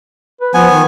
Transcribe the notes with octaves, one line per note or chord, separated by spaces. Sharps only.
B4
F3 B3 G#5
D#3